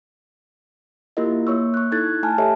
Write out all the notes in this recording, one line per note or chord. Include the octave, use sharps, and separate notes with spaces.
A#3 E4 F4 G4 A#4 D#5
A#3 C#5 C#6 E6
C#6 F#6
D#4 E4 A4 F#6 G#6 A6
A3 G#5 A5 F6
G4 A4 C#5 D#5 E5 A5